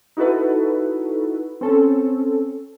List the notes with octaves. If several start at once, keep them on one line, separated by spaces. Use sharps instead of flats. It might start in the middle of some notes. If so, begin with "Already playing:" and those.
D#4 E4 F#4 A4 B4
C4 C#4 A4